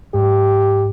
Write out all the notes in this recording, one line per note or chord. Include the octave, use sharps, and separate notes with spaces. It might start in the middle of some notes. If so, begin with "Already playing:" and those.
G#2 G4